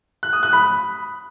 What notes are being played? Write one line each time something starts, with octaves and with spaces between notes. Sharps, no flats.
F#6
D#6
F#6
B5